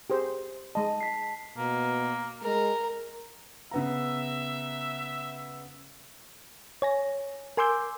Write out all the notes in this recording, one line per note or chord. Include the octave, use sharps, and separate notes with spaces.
G4 G#4 C5
G#3 D#5 A5
B6 C7
B2 A#3
G#3 A#4
C#3 B3 E5 A#5
C#5 G#5 A#6
A#4 G#5 C6 D6 E6 G6